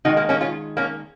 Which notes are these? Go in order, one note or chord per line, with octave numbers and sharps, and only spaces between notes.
D#3 G#3 D#4 F#4
A#3
A#3 C#4
C#4 F4
A#3 C#4